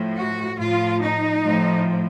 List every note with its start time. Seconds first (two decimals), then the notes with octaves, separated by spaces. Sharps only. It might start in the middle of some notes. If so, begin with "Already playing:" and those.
Already playing: A2 F3
0.17 F#4
0.59 A2 F3 F4
1.02 D#4
1.43 A2 F3